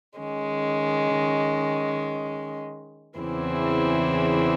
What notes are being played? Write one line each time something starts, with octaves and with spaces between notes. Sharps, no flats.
D#3 G#3 C#4
E2 C#3 E3 C4 E4